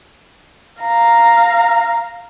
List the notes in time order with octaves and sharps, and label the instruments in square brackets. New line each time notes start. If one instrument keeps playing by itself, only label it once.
[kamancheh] F5 A#5